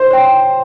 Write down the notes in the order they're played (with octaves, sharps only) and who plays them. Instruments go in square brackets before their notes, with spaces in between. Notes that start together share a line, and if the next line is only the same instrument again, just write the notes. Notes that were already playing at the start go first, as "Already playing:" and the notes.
Already playing: [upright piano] C5
[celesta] C#5 G5 C6